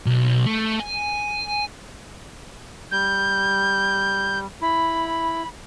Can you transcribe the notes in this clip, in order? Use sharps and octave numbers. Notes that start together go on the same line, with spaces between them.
B1
A3
G#5
G3 G6
E4 B5